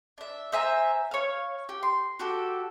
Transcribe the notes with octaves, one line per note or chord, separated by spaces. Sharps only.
D4 E5
C5 E5 G#5 A#5
C#5 F5
G4
C6
F#4 G4 A4